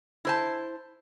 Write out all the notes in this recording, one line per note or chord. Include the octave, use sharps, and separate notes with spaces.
E4 C5 A5